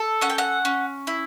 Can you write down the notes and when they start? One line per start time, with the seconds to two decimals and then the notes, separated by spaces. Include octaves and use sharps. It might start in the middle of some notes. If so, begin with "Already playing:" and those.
Already playing: A4
0.21 C#4 F#5
0.30 G5
0.38 F#5
0.65 C#4
1.07 E4